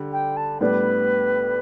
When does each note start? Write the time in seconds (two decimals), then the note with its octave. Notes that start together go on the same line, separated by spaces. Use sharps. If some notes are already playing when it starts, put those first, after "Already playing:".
Already playing: D3 G3
0.12 G5
0.37 A5
0.60 A2 G3 B3 D4 B4